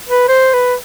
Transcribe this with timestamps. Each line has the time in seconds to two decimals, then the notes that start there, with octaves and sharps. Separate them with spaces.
0.09 B4
0.28 C5
0.54 B4